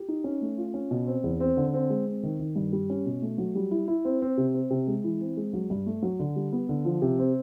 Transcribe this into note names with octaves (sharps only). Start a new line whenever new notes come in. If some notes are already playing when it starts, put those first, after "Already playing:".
Already playing: G4
D#4
C#4
A3
F4
C#4
B2
C4
E2
C4
D3
C4
G#3
C4
D#3
D#3
G2
G3
C#4
B2
A3
F#3
G3
E4
E4
C4
C4
C3
C4
C3
G#3
E3
C4
G#3
F#3
G2
A3
F#3
D3
G3
B3
D3
F3
C3
C4